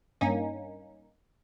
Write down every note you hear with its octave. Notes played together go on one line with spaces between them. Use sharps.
G2 A#3 C#4 D#4